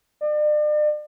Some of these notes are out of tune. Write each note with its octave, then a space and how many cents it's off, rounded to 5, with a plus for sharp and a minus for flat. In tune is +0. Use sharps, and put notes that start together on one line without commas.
D5 +40